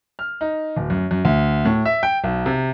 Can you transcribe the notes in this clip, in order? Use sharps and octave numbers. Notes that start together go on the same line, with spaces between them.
F6
D#4
D1
F#2
F#2
D2
A2
E5
G5
B1
C3